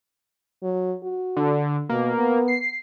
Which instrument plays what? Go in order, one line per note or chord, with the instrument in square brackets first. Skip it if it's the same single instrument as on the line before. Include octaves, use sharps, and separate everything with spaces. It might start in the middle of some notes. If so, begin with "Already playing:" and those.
[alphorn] F#3
F#4
[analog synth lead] D3
[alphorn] B2 [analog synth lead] A#3
[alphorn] B3
[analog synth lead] C7